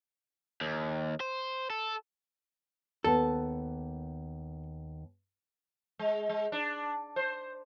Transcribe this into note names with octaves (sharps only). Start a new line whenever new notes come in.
D#2
C5
A4
D#2 B3 A4
G#3
G#3
D4
C5